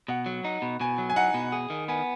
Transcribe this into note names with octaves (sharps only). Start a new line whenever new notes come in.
B2 F#5
F#3
D#4
B2
B2 G#5
F#3
G#5
D#4 F#5
B2
G#4
D#3
B3 G#5